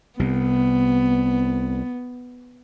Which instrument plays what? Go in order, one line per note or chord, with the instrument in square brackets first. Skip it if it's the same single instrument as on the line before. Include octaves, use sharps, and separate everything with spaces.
[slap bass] C2 C3 [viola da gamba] B3